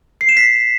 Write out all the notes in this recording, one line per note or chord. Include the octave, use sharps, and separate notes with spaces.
C7
E7
B6